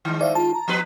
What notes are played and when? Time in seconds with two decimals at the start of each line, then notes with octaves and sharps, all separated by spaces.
0.05 D#3 G#3
0.21 C5 D5 E5 F5
0.35 F4 A5
0.54 A#5
0.68 F3 B3 B4